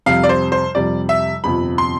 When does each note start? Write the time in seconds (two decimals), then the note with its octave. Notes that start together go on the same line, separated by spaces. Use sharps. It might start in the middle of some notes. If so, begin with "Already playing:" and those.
0.06 F2 C3 G3 F5
0.23 D5
0.29 C5
0.52 C5
0.75 F2 C3 G3 D5
1.09 E5
1.44 G1 F2 C3 F3 B5
1.78 C6